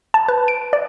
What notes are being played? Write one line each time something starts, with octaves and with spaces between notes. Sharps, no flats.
A5
B4
D7
D5